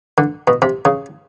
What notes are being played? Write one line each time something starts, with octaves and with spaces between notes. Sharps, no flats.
D3
B2
C3
C#3